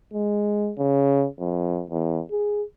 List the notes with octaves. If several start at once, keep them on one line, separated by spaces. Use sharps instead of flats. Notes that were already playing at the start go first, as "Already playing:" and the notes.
G#3
C#3
F2
E2
G#4